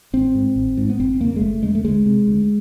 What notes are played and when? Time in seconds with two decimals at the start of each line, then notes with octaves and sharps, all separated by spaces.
0.13 G#1 C4
0.35 G#2
0.56 G#1
0.77 G#2
0.90 B3
1.00 F#1 C4
1.20 E2 C#3 A#3
1.36 G#3
1.41 F#1 A3
1.63 E2 C#3 G#3
1.75 A3
1.84 D2 G#3
2.06 C3
2.28 D2